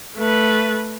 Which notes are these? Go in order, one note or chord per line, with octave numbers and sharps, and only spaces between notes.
A3 B4